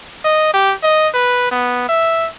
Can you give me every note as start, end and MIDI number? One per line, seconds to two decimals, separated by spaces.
0.25 0.52 75
0.54 0.74 67
0.83 1.08 75
1.14 1.49 71
1.51 1.89 59
1.89 2.29 76